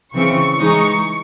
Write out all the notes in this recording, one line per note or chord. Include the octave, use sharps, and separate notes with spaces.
C#3 E3 C4 C#6
E3 G#3 D#4 C#6